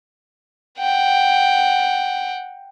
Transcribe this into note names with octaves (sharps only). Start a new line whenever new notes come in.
F#5 G5